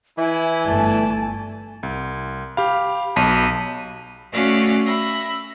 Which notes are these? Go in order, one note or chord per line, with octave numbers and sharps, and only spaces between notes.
E3 E4 G#5
G1 A3 D5 A5
C2
G4 F5 B5
B1 A5 B6 D#7
A3 C#4 F#4 D5 F5
E5 B5 A#6